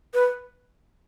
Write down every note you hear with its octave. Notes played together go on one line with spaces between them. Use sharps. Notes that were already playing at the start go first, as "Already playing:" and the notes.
B4